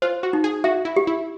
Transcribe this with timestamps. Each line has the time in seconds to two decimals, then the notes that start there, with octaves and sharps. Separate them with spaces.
0.02 F4 C5
0.23 F#4
0.33 D#4
0.44 G#4
0.64 F#4 E5
0.85 E4
0.96 G4
1.07 E4